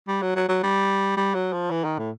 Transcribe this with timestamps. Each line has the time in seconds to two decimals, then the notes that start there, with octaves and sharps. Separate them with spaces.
0.08 G3
0.22 F#3
0.36 F#3
0.49 F#3
0.63 G3
1.17 G3
1.35 F#3
1.53 F3
1.71 E3
1.85 D#3
1.99 A2